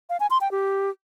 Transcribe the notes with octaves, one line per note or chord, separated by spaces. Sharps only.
F5
G#5
C6
G5
G4